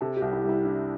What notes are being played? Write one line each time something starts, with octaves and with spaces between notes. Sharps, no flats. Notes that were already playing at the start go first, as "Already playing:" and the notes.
C3 A4
G4
C2
E4
G3
E4
D4 E4